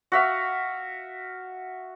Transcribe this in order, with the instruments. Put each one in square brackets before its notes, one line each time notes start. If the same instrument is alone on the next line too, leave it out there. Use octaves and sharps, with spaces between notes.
[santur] F#4 E5 F5